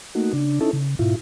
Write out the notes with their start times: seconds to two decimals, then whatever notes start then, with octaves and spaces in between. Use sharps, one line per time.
0.15 A3 A#3 D#4 F#4
0.33 C#3 D4
0.61 C#4 D#4 E4 A4
0.73 C#3
0.99 G#2 B2 E4 F4